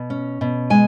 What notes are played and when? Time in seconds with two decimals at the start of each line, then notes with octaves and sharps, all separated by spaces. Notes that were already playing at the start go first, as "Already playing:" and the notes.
Already playing: B2
0.10 C#4
0.41 B2
0.70 G#3 G#5